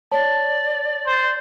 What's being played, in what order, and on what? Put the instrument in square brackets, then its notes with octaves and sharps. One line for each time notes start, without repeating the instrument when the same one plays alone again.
[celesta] C#5 A5 [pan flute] D5
[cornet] C5